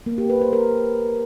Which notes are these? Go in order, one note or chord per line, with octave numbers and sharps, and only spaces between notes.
A#3
G4
B4
C5
A#4